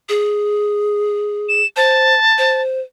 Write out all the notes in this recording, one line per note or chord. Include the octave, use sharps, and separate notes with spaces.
G#4
E7
C5 A5
C5